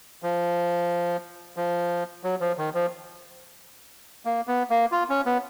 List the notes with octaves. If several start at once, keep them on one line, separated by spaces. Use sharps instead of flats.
F3
F3
F#3
F3
D#3
F3
A#3
B3
A#3
F4
C#4
B3